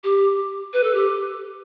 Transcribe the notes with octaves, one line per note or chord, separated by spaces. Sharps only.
G4
B4
A4
G4